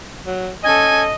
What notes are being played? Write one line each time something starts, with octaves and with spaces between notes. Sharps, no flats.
F#3
C#4 A4 D#5 G#5